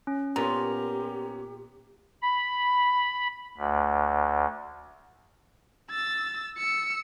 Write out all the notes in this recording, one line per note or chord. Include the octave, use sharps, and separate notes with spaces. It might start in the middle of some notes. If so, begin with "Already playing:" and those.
C#4
A#2 B3 C#4 G4 A#5
B5
D2
E6 A6
E6 C#7